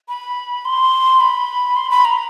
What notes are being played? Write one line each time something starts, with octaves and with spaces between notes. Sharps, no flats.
B5
C6
B5
C6
B5
A#5